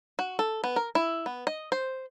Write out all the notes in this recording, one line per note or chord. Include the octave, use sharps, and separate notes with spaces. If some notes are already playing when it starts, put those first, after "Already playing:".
F#4
A4
B3
A#4
E4
B3
D#5
C5